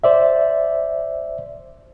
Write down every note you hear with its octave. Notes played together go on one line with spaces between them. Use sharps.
C5 D5 E5